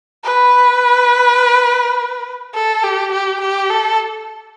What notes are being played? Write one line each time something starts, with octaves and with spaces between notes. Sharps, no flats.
B4
A4
G4
G4
G4
A4